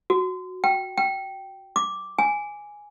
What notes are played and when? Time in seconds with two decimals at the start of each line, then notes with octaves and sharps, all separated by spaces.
0.10 F#4
0.64 G5
0.98 G5
1.76 D6
2.19 G#5